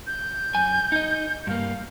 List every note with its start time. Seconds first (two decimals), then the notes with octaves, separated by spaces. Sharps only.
0.07 G6
0.55 F#2 G#5
0.92 D#4 D#5
1.47 G2 A#3 F5